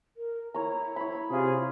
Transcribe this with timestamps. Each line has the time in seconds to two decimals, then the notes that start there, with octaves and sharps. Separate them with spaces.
0.17 A#4
0.54 E4 C#5 A#5
0.96 C#5 B5
1.31 C3 F4 G#4